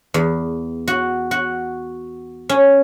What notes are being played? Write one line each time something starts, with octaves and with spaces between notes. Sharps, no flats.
E2
F#4
F#4
C#4